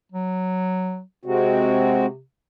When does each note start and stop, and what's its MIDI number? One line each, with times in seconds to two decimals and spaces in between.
0.12 1.01 54
1.25 2.22 48
1.25 2.06 56
1.25 2.06 60
1.25 2.06 66